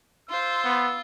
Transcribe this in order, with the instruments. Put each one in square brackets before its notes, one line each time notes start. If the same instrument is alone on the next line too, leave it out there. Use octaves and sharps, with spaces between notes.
[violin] F4 [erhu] C5 [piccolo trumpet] E6
[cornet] B3